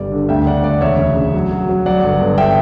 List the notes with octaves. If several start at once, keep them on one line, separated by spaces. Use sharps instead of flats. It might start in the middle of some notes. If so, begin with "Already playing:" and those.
Already playing: G1 G3 D5
D3
D2 E5 G5
D3 D5 F#5
D2 D5 F#5
E1 C#5 E5
C#3
C#3
F#3
F#3
F#3
F#3 D5 F#5
G1
G1
E5 G5